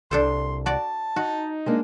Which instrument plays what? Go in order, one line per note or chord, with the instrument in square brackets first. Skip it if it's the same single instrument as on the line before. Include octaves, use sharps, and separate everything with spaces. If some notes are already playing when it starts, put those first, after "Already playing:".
[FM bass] C2 [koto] D4 A4 C5 [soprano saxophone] C6
[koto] F#4 D5 [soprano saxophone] A5
[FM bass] D#4 [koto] F#4
[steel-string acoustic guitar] G#3 A#3 D4